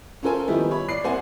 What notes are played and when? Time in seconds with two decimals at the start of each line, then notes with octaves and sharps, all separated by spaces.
0.23 C#4 F4 A4 A#4 C5 G#5
0.48 D#3 F3 G3 A#3 B3 E4
0.71 C#5 B5
0.89 D5 C7
1.04 C2 A#3 C5 F#5 G#5